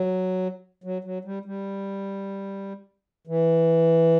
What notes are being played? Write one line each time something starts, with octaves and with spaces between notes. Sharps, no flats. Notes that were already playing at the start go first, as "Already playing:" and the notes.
Already playing: F#3
F#3
F#3
G3
G3
E3